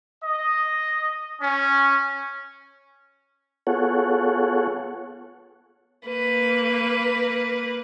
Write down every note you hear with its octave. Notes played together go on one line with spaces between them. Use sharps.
D#5
C#4
B3 F4 G#4 A4 C#5 F#5
A#3 B4